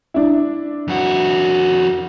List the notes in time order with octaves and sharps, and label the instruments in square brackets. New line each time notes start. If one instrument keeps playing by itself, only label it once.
[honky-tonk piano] D4 E4
[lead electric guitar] F2 F#4